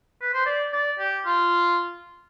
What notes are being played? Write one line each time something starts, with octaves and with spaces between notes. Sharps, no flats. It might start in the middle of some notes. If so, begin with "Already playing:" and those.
B4
C5
D5
D5
G4
F4